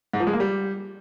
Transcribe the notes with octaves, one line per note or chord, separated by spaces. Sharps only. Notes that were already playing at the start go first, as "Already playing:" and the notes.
G#2
F3
G#3
A#3
G3